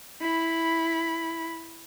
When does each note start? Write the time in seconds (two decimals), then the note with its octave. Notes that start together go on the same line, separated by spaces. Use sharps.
0.21 E4 B5